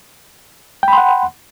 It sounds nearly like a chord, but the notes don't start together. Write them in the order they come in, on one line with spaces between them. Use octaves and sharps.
G5 B5 C6 F#5